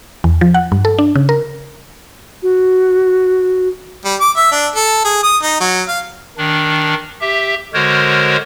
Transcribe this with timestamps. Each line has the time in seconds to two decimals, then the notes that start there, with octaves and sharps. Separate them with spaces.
0.24 E2
0.41 F3
0.54 F#5
0.72 G2
0.85 A4
0.99 D4
1.16 C#3
1.29 A#4
2.43 F#4
4.05 G3
4.21 D6
4.37 E5
4.52 D4
4.76 A4
5.05 G#4
5.23 D#6
5.43 D#4
5.60 F#3
5.88 F5
6.38 D#3 D4
7.21 G4 E5
7.74 D3 G#3 F#4 A#4 C5 C#5